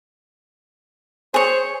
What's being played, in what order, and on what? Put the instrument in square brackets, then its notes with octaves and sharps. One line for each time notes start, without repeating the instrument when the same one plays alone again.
[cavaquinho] G#4 C#5 [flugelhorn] C5